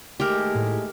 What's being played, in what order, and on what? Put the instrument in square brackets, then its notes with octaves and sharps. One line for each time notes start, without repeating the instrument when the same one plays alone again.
[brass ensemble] D#2 G#3 A3 [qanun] G4 A#4
[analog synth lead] A2